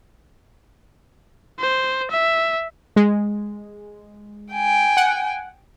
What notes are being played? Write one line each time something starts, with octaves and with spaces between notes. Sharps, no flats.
C5
E5
G#3
G5 G#5
F#5